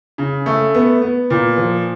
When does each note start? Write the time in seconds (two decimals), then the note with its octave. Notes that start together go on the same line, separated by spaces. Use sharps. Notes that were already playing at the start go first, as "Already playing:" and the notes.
0.18 C#3
0.46 A3
0.74 B3
1.02 B3
1.30 A#2
1.58 F3